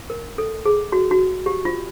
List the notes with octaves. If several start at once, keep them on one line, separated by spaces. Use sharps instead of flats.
A#4
A4
G#4
F#4
F#4
G4
F4